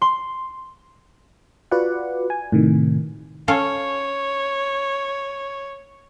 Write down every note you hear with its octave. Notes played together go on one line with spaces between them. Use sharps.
C6
F4 F#4 B4 D5 F#5
G#5
A2 C3 D#3
C#4 A4 C#5 F5